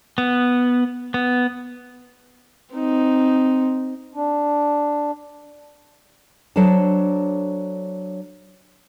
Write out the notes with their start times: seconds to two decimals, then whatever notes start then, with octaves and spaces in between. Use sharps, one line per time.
0.18 B3
1.14 B3
2.74 C4 D#4
4.13 D4
6.56 F#3 D4 A4 C5 A5